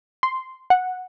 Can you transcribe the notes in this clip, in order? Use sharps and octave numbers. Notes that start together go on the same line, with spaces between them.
C6
F#5